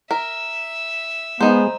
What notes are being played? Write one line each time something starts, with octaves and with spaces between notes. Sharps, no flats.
A#4 E5
G#3 B3 D#4 C5